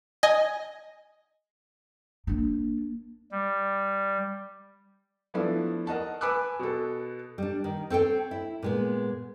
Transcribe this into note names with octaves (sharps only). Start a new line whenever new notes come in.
D#5 G#5
A#3 D4
G3
F3 A3 B3 D4 E4
A#4 D#5 F#5 A5
B4 G#5 B5 D6 E6 F#6
B2 A4
G3 D4
D#3
C4 A4 C#5 G5
E4
A#2 G#3 B3